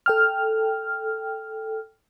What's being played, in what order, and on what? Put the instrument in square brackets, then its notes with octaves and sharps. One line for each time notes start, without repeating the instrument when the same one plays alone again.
[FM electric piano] A4 G5 F6